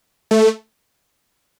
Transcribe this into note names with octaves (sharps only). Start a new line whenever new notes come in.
A3